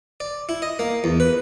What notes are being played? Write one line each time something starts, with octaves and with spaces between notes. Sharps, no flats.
D5
E4
D#5
A#3
E2
B4